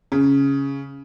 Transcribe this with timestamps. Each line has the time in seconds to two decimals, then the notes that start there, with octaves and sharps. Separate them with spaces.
0.12 C#3